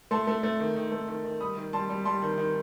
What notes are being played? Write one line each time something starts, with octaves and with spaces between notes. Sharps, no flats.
A3 A5 C6
A3
A3
D#3
D#3
A3
D#3
D#3
G3 B5 D#6
D#3
G3 A5 C6
G3
G3 A5 C6
D#3
D#3